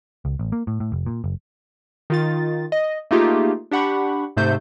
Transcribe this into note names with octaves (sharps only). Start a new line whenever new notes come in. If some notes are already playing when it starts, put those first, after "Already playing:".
C#2
A1
A#3
A2
A2
F1
A#2
F#1
D#3 F4 A6
D#5
A3 A#3 D#4 F4 G4 G#4
D4 G4 F#5 B5 C#6
G#2 C3 A3 C5 G6